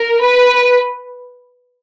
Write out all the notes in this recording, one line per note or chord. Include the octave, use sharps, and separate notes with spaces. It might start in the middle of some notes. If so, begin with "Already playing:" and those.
Already playing: A#4
B4